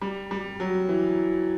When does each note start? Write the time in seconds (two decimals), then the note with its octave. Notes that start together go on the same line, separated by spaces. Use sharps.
0.02 G3
0.31 G3
0.60 F#3
0.89 E3